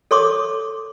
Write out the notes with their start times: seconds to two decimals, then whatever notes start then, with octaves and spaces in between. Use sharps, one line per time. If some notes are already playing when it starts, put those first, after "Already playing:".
0.11 A4 C#5 C6 D6 D#6